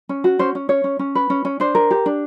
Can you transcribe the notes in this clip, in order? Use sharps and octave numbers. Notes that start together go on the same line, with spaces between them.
C#4
F#4
C#4 C5
C#4
C#4 C#5
C#4
C#4
B4
C#4
C#4
D4 C5
A#4
G4
D4